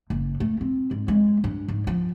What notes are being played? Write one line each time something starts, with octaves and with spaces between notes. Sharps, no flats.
F#1
A3
C4
G#2
G#3
G2
G#2
F3